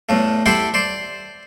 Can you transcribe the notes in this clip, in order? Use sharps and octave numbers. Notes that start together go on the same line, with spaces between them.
E2 A2 A3
E4 G4 A4 C5 F#5 G5
C5 D5